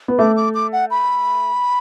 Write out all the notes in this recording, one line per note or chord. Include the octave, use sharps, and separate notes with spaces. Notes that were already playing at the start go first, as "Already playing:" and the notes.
B3
A3 D6
D6
D6
F#5
B5